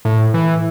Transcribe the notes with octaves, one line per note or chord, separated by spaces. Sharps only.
A2
E3